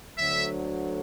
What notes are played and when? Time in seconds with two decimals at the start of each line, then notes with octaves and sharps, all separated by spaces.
0.16 D2 D3 F#3 E5